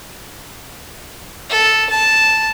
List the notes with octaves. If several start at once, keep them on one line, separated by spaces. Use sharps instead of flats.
A4
A5